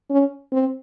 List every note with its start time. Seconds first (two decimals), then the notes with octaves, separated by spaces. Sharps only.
0.11 C#4
0.53 C4